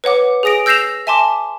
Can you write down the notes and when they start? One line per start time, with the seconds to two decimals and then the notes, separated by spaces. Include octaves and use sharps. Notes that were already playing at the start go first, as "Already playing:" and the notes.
0.04 B4 C#5 F#5 D6
0.43 G#4 G#5 D#6 A#6 D7
0.66 E6 G6 A#6 C7 E7 F7
1.07 E5 G#5 A5 C6 D6